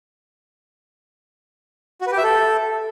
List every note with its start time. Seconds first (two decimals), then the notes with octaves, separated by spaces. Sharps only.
2.01 F#4
2.07 B4
2.12 G4
2.18 E5
2.23 A4